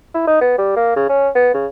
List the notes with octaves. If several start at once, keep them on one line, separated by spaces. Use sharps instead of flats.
E4
D#4
B3
G3
A#3
C#3
C#4
B3
C#3